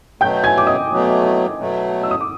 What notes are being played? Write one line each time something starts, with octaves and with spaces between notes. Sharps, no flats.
B2 F#3 A3 G5 G6
G#5 G#6
D6
D#5 D#6
B2 F#3 A3
B2 F#3 A3
E6
D#6
D6